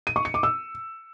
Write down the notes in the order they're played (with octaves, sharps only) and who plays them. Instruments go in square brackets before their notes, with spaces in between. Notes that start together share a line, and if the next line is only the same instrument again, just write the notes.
[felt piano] D#7
C#6
C#7
D6
E6